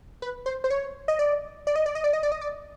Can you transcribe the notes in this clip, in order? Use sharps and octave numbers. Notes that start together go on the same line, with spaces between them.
B4
C5
C5
C#5
D#5
D5
D5
D#5
D5
D#5
D5
D#5
D5
D#5
D5